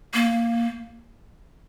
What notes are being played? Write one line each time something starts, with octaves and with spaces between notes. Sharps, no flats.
A#3